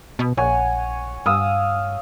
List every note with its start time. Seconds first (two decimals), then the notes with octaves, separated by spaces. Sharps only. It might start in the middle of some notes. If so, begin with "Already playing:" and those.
0.19 B2
0.37 A#1 C#5 F#5 G#5
1.26 G2 F5 D#6 E6